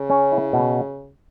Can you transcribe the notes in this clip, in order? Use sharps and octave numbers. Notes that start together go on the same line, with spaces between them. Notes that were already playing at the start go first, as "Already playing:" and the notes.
Already playing: C#3
C#4
E4
B2